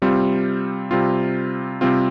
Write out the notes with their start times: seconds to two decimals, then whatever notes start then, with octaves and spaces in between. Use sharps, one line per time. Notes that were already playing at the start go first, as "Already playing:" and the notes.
0.02 C3 G3 C4 F4
0.91 C3 G3 C4 F4
1.81 C3 G3 C4 F4